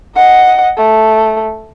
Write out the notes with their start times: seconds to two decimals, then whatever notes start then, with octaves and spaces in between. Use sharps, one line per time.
0.16 D#5 F#5
0.78 A3